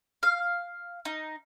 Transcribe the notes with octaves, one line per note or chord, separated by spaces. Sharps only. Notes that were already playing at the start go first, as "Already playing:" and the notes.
F5
D#4